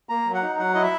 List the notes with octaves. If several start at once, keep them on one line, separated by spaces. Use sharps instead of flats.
A#3 A#5
F#3
F#5
D#4
F#3 F#5
E4 D#5
E5